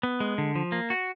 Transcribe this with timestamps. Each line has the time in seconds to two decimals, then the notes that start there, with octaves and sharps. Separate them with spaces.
0.03 B3
0.20 G#3
0.38 D3
0.56 F3
0.72 A#3
0.90 F#4